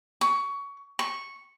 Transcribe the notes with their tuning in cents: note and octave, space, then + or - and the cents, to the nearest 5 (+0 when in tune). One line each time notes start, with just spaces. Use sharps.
C#6 +20
C#6 -5